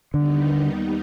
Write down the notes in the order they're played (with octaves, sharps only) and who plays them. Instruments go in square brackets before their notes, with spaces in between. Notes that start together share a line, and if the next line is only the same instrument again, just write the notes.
[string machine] D#2 D#3 G3 B3 D#4 [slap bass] D3